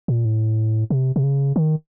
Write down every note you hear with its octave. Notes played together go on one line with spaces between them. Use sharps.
A#2
A2
C3
C3
C#3
D#3